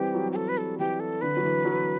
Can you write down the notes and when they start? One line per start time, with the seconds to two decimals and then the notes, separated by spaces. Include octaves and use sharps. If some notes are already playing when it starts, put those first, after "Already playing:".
Already playing: E3 G3 C4 G4
0.14 F#3
0.32 G4
0.36 A4
0.48 B4
0.57 A4
0.78 E3 G4
1.00 A4
1.21 D3 B4
1.37 F#3
1.44 E3
1.65 F#3